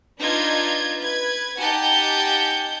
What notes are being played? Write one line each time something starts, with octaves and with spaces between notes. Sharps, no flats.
D4 D#4 F4 B4 G6 G#6
B4 G#6
D#4 G4 F#5 G#5 A5 G6